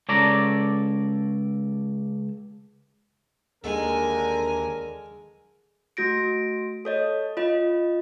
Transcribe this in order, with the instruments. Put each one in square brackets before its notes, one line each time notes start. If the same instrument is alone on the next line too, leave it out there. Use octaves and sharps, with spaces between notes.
[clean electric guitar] C#2 A4 C#5 D5 A5 A#5
[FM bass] D#2 [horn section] D3 A#4 [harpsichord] G#3 A4 [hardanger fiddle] G#5
[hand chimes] A3 F#4 A#6 D7
A4 C#5 D#5
F4 D#5